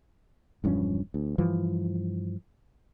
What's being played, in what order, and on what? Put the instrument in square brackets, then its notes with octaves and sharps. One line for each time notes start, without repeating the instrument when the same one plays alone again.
[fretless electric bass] E1 G2 F3 C#4
D2
G2 E3 F3